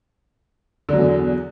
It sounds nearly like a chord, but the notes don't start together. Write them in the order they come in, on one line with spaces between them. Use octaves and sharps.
D3 F#3 E2